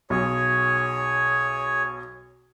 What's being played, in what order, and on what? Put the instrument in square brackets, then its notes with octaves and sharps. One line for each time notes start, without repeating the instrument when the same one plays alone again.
[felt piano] B1 [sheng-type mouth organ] G#4 C#5